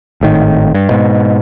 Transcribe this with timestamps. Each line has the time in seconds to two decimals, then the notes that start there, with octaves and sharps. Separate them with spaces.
0.21 G#1 A2 D#3
0.75 G2
0.90 G#2 B2